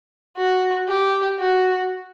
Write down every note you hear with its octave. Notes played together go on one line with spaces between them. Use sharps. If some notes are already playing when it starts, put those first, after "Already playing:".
F#4
G4
F#4